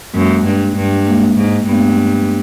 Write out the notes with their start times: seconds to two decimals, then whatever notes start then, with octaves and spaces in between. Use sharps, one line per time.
0.14 F#2 G#3 A#3
0.45 G2
0.76 G2
1.06 G#3 A#3
1.37 G#2
1.68 G2 A3 B3